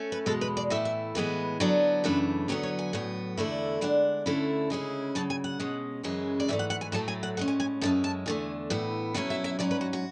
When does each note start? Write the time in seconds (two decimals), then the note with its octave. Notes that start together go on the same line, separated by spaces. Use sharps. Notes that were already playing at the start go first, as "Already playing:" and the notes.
Already playing: A3 C#4
0.12 B4
0.26 E2 B2 G#3 A4
0.41 B4
0.57 D5
0.70 A2 E3 A3 E4 E5
0.85 E5
1.15 A2 E3 G#3 B3 B4
1.60 D3 F#3 B3 D4
2.04 F#2 C#3 E3 A3 D4 B4
2.48 E2 D3 F#3 B3 C#5
2.63 C#5
2.79 G#5
2.93 A2 F#3 B3
3.37 E2 D3 A3 E4
3.81 D3 G#3 D4 F#5
4.26 D2 D3 A3 C#4 E4
4.70 C#3 G#3 C#4 E4
5.15 F#2 C#3 F#3 A5
5.30 G#5
5.44 F#5
5.60 B2 G#3 C#4
6.03 F#2 C#3 E3 G#3 C#4
6.40 D5
6.48 G#2 E3 A3 E5
6.59 F#5
6.70 F#5
6.81 G#5
6.92 A2 F#3 A3 A5
7.08 G#5
7.23 F#5
7.37 A2 G#3 C#4 F#5
7.48 G#5
7.60 G#5
7.81 F#2 D3 G#3 C#4 E4 A5
8.04 A5
8.26 E2 D3 A3 G#5
8.70 A2 E3 B3 E4
9.14 B2 F#3 C#4 E4 F#5
9.30 E5
9.44 E5
9.59 G#2 F#3 C#4 D5
9.71 B4
9.81 F#4
9.93 F#4